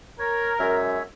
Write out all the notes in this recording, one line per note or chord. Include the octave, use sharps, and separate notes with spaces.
A#4 C#5
F#2 G#3 C#5 E5